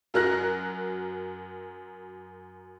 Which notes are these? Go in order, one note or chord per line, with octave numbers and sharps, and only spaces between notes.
F#2 F#3 A#4 F6 F#6 A#6